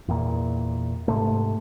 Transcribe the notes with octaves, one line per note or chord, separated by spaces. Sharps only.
E2 A#2
G#2 C3 A3